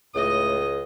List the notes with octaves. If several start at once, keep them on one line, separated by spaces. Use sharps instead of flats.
C#2 A2 D#5